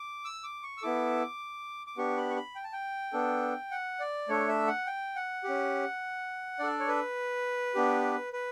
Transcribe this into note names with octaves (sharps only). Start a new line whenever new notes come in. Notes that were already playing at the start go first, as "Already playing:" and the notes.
Already playing: D6
E6
D6
C#6
E6
B3 E4 A4 D6
D6
B3 D4 G4 C#6
B5
C#6
B5
G5
A5
G5
B3 D4 A4
F#5
D5
A3 D4 A4 C#5
E5
F#5
G5
F#5
C#4 G4
D4 A4 D5
C#5
B4
B3 D4 G4
B4